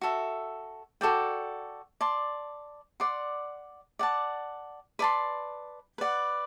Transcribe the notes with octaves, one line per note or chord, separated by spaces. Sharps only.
F#4 A4 E5
F#4 A4 D5 G5
D5 A5 C6
D5 F#5 C6
D5 F#5 A5
B4 D5 A5 C6
B4 D5 F#5